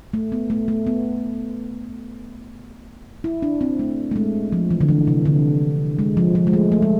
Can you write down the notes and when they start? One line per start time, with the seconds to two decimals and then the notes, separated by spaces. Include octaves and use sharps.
0.14 A3
0.32 B3
0.50 A3
0.68 A3
0.87 B3
3.24 E4
3.42 D4
3.61 C4
3.79 A3
4.11 A3
4.16 G#3
4.52 F3
4.71 E3
4.81 D3
4.89 E3
5.07 C3
5.26 D3
5.99 G#3
6.17 F3
6.35 F3
6.47 G#3
6.53 A3
6.72 A3
6.82 G#3